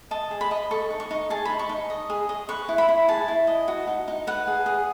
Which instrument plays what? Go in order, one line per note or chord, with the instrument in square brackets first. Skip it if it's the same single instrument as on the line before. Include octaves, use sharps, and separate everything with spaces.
[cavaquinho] D#5 A5
G#4
B5
D#5
A4 C#6
D#4
C#6
D#4
G#4 A5
D#4 B5
C#6
D#4
D#5
G#4
D#5
B4 C#6
E4
B5
E4
G#4 A5
E4
D#5
F#4
D#4
D#4
B4 F#5
G#4
G#4